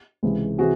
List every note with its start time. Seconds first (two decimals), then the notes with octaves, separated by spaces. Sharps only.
0.23 C#2 C3 E3 G#3
0.58 C3 E3 F#4 G#4